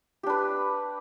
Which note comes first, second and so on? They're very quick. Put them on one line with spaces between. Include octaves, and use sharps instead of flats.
G4 D4 B4